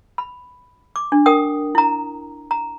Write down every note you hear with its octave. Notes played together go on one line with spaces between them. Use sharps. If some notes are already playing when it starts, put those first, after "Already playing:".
B5
D6
D4
A#4 G5 D#6
E4 A#5
A#5